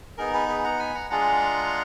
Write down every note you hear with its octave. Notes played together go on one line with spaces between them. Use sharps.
B3 D#4 G#4 A#4
G#4 B4
G#4 B4
F#5 A#5
G#5 B5
F#5 A#5
G#3 D4 F4 G#4 F#5 A#5